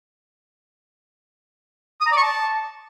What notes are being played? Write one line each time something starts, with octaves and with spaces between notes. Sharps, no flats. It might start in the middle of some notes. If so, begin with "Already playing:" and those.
D#6
A#5
D5
C#6
A5